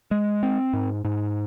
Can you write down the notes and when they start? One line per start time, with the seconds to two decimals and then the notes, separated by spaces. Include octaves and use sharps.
0.11 G#3
0.43 C4
0.73 G#2
1.05 G#2